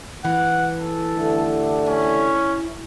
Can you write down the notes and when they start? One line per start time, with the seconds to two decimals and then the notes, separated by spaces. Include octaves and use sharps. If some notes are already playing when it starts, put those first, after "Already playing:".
0.25 E3 F#5
0.80 A4
1.16 D3 G3 A3
1.86 C#4 E4